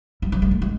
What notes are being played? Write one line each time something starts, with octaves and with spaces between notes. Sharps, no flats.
G3
F#3
G#3
A3
G#3